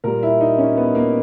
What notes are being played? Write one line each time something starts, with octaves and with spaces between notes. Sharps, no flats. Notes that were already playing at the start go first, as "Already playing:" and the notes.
A#2 G3 A#4
E4
D#4
C#4
B3
A#3